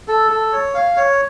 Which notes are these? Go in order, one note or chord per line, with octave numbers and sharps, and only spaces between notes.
A4
A4
C#5
F5
C#5